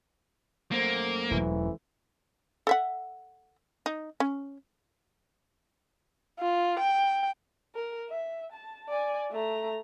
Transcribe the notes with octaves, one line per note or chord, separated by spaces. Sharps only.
F#2 A3 A#3 C5
E1 E3 F#3
A4 E5 F#5
D#4
C#4
F4
G5
A#4
E5
A5
D5 G#5
A3 A#5